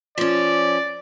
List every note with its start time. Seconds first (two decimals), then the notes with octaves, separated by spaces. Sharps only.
0.18 F3 C#4 D5